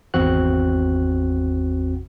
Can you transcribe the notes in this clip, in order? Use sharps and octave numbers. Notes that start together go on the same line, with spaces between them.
G#1 E2 C4 F#4 F#6